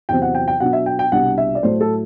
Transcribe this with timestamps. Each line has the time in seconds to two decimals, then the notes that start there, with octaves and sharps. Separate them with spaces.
0.09 E2 C3 F#3 C4 G5
0.22 F#5
0.35 G5
0.48 G5
0.60 B2 F#3 B3 D4 F#5
0.73 E5
0.86 G5
0.99 G5
1.12 C2 B2 G3 D4 F#5
1.38 E5
1.55 D5
1.63 A2 F#3 A3 C5
1.81 A4